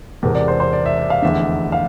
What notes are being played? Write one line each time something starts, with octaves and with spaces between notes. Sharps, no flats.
E1 E2 C3 A#4
D5
C5
C5
D5
E5
D5
F5
F1 E2 D3 E5
F5